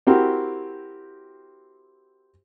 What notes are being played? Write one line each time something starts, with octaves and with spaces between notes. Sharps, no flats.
C4 E4 F#4 G4 A#4